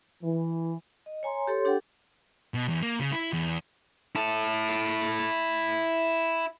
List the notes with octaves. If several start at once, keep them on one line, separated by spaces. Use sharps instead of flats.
E3
D#5
C#5 G#5 A#5 C6
G4 A4 C#5 C6
D4 G4 A4 F#5 G5
B2
E2
A#3
C#3
E4
E2
E4 A5